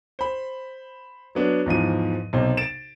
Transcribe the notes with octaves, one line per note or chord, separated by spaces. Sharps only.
C5 B5
F#3 B3 D4
E2 G#2 F3 D#7
B1 C3 C5
A6 D7 E7